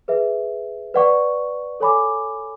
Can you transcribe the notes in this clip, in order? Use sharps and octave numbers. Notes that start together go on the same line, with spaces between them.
G#4 B4 E5
B4 D5 F#5 C#6
A4 C#5 G#5 B5 D6